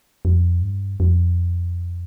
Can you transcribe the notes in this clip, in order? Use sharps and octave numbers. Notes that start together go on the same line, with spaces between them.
F2
G2
F2